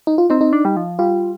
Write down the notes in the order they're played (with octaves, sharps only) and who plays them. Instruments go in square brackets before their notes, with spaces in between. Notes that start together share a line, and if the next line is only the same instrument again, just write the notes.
[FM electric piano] D#4
F4
[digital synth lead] C4 [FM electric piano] D#4
[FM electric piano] D#4
[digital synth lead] D4
G3
F3
[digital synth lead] G3 [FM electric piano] F4